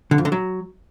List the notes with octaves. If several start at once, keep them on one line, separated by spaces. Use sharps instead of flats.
D3
F2
D3
F#3